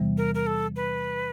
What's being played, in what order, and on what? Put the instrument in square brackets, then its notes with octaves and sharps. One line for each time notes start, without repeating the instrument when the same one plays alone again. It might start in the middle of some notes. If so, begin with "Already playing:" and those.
Already playing: [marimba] E2 C3 E3 G3 B3
[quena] A#4
A#4
A4
B4